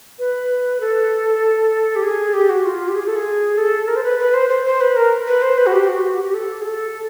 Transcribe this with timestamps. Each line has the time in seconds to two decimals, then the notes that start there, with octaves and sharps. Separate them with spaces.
0.19 B4
0.80 A4
1.96 G4
2.03 G#4
2.34 G4
2.50 F#4
2.65 F4
2.88 G4
2.95 G#4
3.07 A4
3.16 G#4
3.58 A4
3.88 A#4
3.96 C5
4.03 B4
4.19 B4
4.34 C5
4.50 C5
4.66 C5
4.81 B4
4.96 A#4
5.27 B4
5.42 C5
5.58 B4
5.66 F#4
5.72 G4
5.88 F#4
6.04 F#4
6.14 G4
6.24 G4
6.34 A4
6.61 G#4
6.65 A4